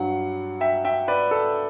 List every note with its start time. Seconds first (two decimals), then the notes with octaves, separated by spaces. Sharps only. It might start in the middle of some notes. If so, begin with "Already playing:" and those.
Already playing: G2 F#3 F#5
0.61 E5 G5
0.85 E5 G5
1.08 B4 D5
1.31 A4